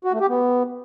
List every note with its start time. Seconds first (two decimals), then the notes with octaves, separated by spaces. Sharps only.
0.04 F#4
0.12 A3
0.21 G4
0.29 B3